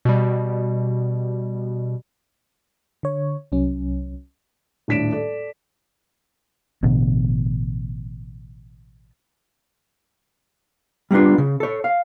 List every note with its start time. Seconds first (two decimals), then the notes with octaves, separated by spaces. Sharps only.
0.05 B2 G3
3.03 D3 C#5
3.52 C2 F#3 C#4
4.88 D#1 A2 D4 B6 D7 E7
5.12 A4 D5
6.83 A1 B2 D3
11.11 G3 A#3 B3 D4 F4
11.38 C#3
11.60 A4 C#5
11.84 F5